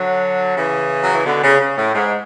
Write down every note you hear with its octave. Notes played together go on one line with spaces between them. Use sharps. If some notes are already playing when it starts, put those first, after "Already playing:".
Already playing: D3 F#3
C#3 E3
F#3
E3
B2 D3
C#3
C#3
A2
G#2